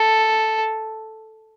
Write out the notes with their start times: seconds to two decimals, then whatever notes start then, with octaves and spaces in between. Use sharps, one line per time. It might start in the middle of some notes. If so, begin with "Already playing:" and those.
Already playing: A4